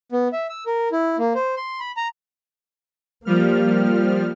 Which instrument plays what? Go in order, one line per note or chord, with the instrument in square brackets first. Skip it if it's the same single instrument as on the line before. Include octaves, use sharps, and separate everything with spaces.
[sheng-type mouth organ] B3
E5
E6
A#4
E4
A#3
C5
C6
B5
A#5
[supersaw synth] F3 G3 F6 [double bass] A#3